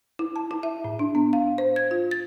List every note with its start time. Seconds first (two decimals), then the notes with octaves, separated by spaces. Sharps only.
0.19 E4
0.36 A5
0.51 E4
0.63 E5
0.84 A2
0.99 D4
1.15 B3
1.33 F5
1.58 C5
1.76 G#6
1.91 F4
2.11 A6